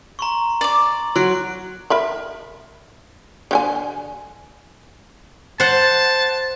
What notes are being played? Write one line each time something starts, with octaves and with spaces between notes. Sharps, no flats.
A#5 C6 C#6
D5 D6
F#3 C6 F#6 D7
A#4 E5 B5
D3 G5 G#5
C5 F#5 A5